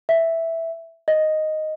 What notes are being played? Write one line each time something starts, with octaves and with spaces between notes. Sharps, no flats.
E5
D#5